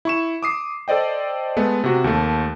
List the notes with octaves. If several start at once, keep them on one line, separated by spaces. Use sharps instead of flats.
E4 C#6 E7
D6 D#6 C7
A4 C5 D5 D#5 G5
G#3 A3 B3
C3 F#4
D#2 A3